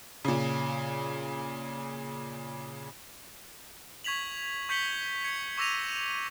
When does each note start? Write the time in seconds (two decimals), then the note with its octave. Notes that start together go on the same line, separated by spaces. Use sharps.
0.25 A#2 C#3
4.04 C#6 G#6 B6 F7 F#7
4.69 C#6 G6 B6 C#7 F#7 G7
5.24 G#6 C#7
5.58 C#6 D6 E6 A#6 D#7 F7